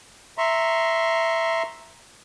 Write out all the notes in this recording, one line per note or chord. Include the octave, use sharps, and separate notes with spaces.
E5 A#5 C6 C#6